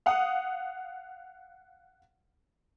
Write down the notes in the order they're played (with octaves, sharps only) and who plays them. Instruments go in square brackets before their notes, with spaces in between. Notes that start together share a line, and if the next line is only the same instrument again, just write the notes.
[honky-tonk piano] F5 F#5 D#6